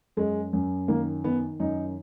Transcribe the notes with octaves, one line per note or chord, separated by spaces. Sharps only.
F#2 G#3
F#2
D#3 A#3
D#3 B3
F#2 D#4